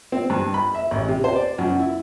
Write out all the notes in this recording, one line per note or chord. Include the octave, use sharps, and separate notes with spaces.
C4
G2
B5
E5
A1
C3
C5
D5
F#2
E4